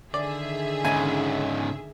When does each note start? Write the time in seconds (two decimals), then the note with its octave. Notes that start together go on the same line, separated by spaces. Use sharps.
0.14 D3 D#3 G#4 D5 E5
0.85 G#2 C#3 G#5